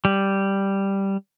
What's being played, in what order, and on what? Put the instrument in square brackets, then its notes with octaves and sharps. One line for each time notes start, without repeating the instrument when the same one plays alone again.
[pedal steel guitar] G3